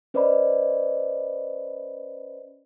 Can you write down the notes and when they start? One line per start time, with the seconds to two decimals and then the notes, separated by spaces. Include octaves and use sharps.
0.14 C#4 B4 C5 D5 D#5 B5